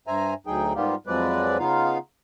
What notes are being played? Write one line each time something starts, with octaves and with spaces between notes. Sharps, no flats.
G2 C5 E5 G#5 A#5
D2 F#3 D#4 G#4 G5
G#2 G3 A#3 B3 F4 G4
F2 F3 F#3 G#3 B4 D5
C#3 B3 D#4 F4 F5